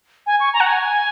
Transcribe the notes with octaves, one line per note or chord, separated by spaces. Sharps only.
G#5
C#6
A#5
F#5
G#5